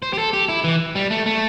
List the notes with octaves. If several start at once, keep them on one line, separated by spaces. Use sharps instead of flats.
C5
G4
A4
G4
E4
E3
G3
A3
A3